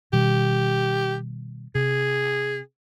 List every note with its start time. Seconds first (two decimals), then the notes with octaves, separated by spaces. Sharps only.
0.13 B2 D#3 G3 G4
1.75 C3 G#4